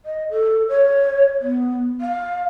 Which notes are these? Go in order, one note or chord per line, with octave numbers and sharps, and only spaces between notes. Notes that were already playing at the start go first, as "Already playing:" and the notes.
D#5
A4
C#5
B3
F5